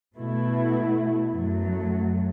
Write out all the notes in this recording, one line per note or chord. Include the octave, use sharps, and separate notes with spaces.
B2 A3 E4
F#2 F#3 A3